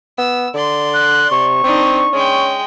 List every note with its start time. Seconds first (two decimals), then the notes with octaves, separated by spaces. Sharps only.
0.18 B3 E6
0.54 D3 D5 C6
0.94 F#6
1.31 C3 C#6
1.64 C4 D4 D#4
2.13 G#3 C#4 G5